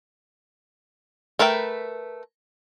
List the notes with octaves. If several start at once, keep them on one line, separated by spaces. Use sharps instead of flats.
A3 A#4 B4 E5 G5